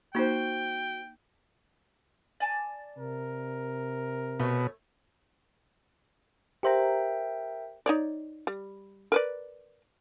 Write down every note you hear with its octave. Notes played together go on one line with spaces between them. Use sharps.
A#3 D#4 F#4 C5 G5
D5 G#5 A5
C3 A#4
B2 A3 C#5
G4 A#4 C5 E5 G5 A#5
D#4 C#5 D5
G3
A#4 B4 D5